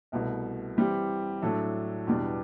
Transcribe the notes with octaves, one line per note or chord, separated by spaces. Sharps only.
C2 B2 A3
E3 G3 C4 G4
A2 F#3 A3 D4 A4
E2 B2 G3 D4